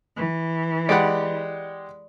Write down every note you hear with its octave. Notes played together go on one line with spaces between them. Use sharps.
E3
G#3 G4 D5 F#5 B5